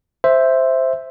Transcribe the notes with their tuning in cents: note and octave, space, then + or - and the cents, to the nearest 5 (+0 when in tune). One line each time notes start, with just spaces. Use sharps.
C5 +0 E5 +0